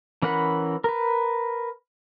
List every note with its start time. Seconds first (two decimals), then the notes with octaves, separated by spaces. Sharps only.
0.22 E3 C#4 A#4 F#5 B5
0.84 A#4 B4